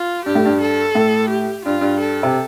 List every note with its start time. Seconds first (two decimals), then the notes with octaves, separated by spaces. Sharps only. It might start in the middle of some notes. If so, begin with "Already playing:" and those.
Already playing: F4
0.25 G2 G4
0.35 A2
0.45 G2
0.61 A4
0.95 A2
1.30 G4
1.65 G2 F4
1.81 G2
2.00 A4
2.23 C3